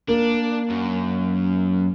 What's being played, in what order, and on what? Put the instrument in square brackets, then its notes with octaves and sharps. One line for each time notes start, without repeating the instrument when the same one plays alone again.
[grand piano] A#3 [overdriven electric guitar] D4
[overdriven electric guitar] F#2